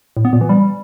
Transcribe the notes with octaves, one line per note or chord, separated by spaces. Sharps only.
A2
B3
A#2
E3
G3